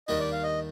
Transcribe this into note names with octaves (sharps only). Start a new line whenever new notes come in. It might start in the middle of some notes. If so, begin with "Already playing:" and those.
D#2 D#3 G3 D4 D#5
D5
F5
D#5